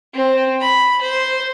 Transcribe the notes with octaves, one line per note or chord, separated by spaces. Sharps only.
C4
B5
C5